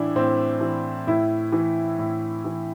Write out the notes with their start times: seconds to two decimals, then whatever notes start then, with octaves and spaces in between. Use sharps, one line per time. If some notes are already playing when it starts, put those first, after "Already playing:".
Already playing: A2 E3 D4 E4
0.15 A2 C4
0.61 E3
1.07 A2 E4
1.52 E3
1.99 A2
2.45 E3